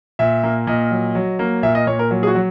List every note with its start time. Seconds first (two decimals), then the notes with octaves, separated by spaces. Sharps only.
0.19 A#2 E5
0.43 A#3
0.67 A#2 D#5
0.91 F#3
1.15 F#3
1.39 A#3
1.63 A#2 E5
1.75 D#5
1.87 A#2 C#5
1.99 A#4
2.11 F#3
2.23 G#4
2.27 F#4
2.35 F#3